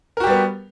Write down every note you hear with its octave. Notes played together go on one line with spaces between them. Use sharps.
G3 B3 F#4 G4 A#4